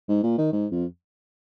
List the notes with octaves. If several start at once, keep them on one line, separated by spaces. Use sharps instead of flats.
G#2
A#2
D#3
G#2
F2